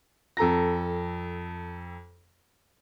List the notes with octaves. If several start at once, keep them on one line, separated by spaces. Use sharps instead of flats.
F2 A4 A#5 A#6